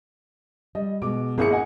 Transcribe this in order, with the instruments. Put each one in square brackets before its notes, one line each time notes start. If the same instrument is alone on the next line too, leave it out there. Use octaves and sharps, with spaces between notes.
[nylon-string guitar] G3 [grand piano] D#5
[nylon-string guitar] B2 G#3 [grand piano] D6
[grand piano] G#1 G#4 C#7 [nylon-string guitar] A#3 E4
[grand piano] D#5 F#5 G#5